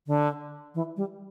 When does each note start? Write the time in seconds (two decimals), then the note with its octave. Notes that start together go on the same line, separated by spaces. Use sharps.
0.07 D3
0.75 E3
0.97 G3